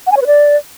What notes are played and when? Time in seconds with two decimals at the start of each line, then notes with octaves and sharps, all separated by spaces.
0.07 F#5
0.12 G#5
0.17 C#5
0.22 B4
0.27 D5